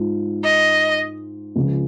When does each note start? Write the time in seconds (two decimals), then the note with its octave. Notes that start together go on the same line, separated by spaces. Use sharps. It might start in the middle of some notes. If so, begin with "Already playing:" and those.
Already playing: G#2 F4
0.44 D#5
1.56 C#2 C#3 F3